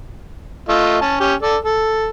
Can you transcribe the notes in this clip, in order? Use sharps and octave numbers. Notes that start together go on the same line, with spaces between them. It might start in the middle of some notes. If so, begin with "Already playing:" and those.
A3 F4 D#5
C#4 A5
C#4 G4
A4 D5 A5
A4